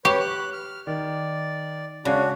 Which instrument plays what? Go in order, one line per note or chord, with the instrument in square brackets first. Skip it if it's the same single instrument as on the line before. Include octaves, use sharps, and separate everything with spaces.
[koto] G4 [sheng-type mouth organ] B4 C#5 [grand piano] C#6
[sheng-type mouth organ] F#6
F6
[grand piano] D#3 [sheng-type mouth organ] D5
[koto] C#3 [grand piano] G#3 C#4 [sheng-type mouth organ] D4 F#4